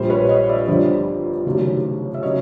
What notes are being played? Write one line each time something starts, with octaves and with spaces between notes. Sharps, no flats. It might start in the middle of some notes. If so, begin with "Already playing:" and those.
Already playing: A#1 A#2 G3 C5
B4 C#5
C#5 D#5
D5 E5
G1 F2 D3 G3 C5 D5
F1 D#2 C#3 F#3
E5
C#3 F#3 C#5 D#5